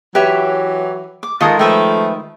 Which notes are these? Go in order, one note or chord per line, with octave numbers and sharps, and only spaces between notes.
E3 F#3 G4 B4 C#5 E5
D6
D#3 G#3 F4 A4 A#4 D#6
F3 A3 B4 E5 G5